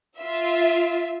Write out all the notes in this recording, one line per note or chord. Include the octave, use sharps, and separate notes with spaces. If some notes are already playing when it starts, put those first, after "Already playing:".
F4 E5